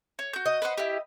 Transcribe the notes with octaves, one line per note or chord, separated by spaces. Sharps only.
C#5
F#4 G6
D#5
B4 C5 F#5
E4 G4